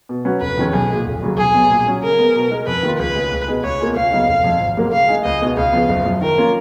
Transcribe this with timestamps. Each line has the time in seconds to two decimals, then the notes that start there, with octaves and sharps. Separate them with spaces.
0.09 B2
0.25 F#3 C#4 F#4 B4
0.41 F1 B4
0.58 F2 D#3 G#3 C#4
0.73 B1 G#4
0.90 A#2 G#3
1.06 F1
1.22 D#2 C#3 F#3
1.38 B1 G#4
1.55 B2 F#3
1.70 A#2
1.87 F#3 C#4
2.03 C#3 A#4
2.19 G#3 B3
2.35 B2
2.51 G#3 D#4 A#4
2.67 F2 B4
2.83 D#3 A#3 F4
2.99 C#2 B4
3.15 C#3 G#3
3.31 C#2
3.48 B2 G#3 D#4
3.63 C#2 C#5
3.80 B2 A#3 F4 G#4
3.96 C#2 F5
4.12 C#3 F#3 B3 D#4
4.29 F1
4.44 F2 F3
4.60 G#1
4.77 G#2 F#3 A#3
4.92 C#3 F5
5.08 G#3 D#4 G#4
5.24 C#2 D#5
5.42 B2 G#3 D#4
5.57 C#2 F5
5.73 C#3 F3 B3
5.89 F#1
6.05 F#2 F3
6.21 D#3 A#4
6.38 A#3 C#4 F4